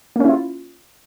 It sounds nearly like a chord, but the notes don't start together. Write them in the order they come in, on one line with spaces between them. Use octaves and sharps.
A#3 C#4 E4 F4